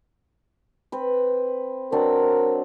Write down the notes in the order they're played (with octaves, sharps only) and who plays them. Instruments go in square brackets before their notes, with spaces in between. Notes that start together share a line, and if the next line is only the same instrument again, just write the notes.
[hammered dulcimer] C4 B4
[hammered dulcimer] F#3 C4 D4 [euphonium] A#4